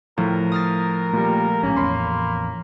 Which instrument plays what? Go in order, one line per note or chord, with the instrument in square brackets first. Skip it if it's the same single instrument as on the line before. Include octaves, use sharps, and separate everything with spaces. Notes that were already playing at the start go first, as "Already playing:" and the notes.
[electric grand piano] A2 [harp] F3 [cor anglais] A#4
[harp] D#6 F6 A6
[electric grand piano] A#2 G3 [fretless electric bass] A3
[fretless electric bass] A#1 G#2 [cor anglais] A#3 [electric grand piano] C#4
[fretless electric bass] A1 E2 [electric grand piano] C#5 B5 C6